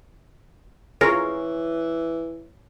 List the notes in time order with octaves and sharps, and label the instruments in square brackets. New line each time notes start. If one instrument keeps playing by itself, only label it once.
[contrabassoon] E3 [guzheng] C#4 [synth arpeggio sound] F4 G#4 A#4